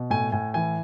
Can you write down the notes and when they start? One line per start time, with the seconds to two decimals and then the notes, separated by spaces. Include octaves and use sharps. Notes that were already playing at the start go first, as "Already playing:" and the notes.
Already playing: B2
0.10 A2 G#5
0.32 A2 G#5
0.54 E3 G#5